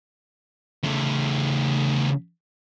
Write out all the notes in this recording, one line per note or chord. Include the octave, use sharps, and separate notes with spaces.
C#3 A3